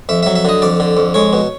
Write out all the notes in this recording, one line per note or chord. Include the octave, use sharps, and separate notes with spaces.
F2 E5
E5
F#3
E5
D3 D#5
F2 D5
D3
F2
G#3 C#5
B2